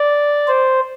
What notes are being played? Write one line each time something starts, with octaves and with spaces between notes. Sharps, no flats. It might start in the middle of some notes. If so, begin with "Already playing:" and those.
Already playing: D5
C5